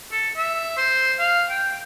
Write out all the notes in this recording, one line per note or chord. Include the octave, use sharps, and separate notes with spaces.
A4
E5
C5
F5
G5